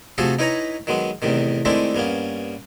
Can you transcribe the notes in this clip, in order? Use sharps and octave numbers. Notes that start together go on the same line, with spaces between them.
C3 F3 A3 F#4 G#4 A4
D#4 E4 B4 C#5 G#5 A#5
D#3 F#3 G#3 B3
E2 A2 C3 D#3
D#3 G#3 A3 C4 D4 E4
G2 A#3 B3 C#4